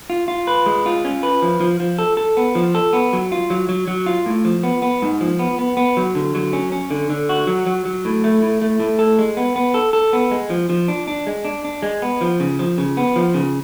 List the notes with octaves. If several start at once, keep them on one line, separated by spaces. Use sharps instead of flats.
F4
F4
B4
G#3
F4
C#4
B4
F3
F3
F3
A4
A4
B3
F3
A4
B3
F#3
F4
F#3
F#3
F#3
F4
A2
F3
B3
B3
G#2
F3
B3
B3
B3
F#3
D3
F#3
C#4
C#4
D3
D3
F#4
F#3
F#3
F#3
A2
A3
A2
A3
A2
A4
G#3
B3
B3
A4
A4
B3
G#3
F3
F3
D4
D4
G#3
D4
D4
G#3
B3
F3
C#3
F3
C#3
B3
F3
C#3